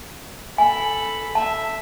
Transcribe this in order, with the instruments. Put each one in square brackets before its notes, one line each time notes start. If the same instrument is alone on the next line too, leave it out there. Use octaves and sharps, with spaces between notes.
[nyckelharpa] A4 B5 [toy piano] G#5
[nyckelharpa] E5 [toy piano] A5